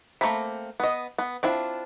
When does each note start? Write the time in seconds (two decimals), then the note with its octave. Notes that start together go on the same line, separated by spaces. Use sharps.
0.21 A3 A#3 C4 A#5 B5
0.80 B3 D#5
1.18 B3
1.43 C4 D4 E4 F4